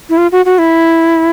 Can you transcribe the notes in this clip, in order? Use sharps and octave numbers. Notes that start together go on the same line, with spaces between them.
E4
F4
F#4
F#4
E4